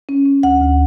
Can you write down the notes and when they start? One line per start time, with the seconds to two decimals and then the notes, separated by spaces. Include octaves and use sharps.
0.09 C#4
0.26 C#4
0.43 D2 F#5
0.61 D2